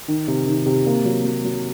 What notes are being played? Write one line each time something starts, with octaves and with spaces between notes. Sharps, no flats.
D#3
C3
D#3
C3
A#3
F#3
F#3
F#3